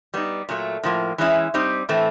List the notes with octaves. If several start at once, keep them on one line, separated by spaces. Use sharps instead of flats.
G3 B3 D#4
A#2 F#3 A3
A2 F3 A#3
E3 G#3 C#4 E4
G3 C4 D#4
A2 E3 A3 C4